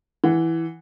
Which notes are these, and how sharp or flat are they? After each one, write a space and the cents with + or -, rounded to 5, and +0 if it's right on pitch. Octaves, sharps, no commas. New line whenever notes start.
E3 +0 F#5 +0